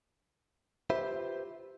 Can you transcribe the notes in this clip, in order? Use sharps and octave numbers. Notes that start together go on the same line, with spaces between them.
F4 G4 B4 C5 E5